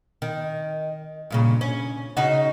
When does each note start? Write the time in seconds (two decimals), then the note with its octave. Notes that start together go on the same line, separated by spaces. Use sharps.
0.22 D#3
1.30 G2 A#2 C#3
1.61 C#4
2.17 C#3 D#4 F#4